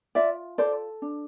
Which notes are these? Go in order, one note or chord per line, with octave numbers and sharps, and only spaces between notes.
F4 D5 E5
A4 C5 D5
D4